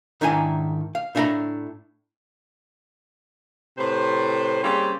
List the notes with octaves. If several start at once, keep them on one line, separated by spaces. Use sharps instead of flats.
G#2 D#3 D4 E4 G4 G#5
F5
A2 D4 E4 E5 A#5 B5
A2 C3 B4 C5
C#3 G3 A#3 C4 C#4 G4